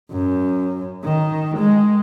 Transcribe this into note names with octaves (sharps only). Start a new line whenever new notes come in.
F#2
D#3
G#3